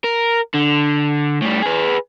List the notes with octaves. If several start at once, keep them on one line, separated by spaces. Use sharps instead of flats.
A#4
D3
A2 G3
G#4 B4